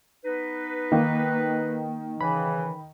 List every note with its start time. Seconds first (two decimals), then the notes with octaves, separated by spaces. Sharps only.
0.25 B3 D#4 B4
0.92 D#3 A#3
2.21 C#3 E3 B5